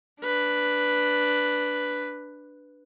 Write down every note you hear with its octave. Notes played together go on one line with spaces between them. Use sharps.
D4 B4